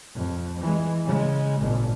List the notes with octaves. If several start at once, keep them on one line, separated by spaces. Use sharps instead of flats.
F2
E3 G#3
C#3 G#3
G#1 A#2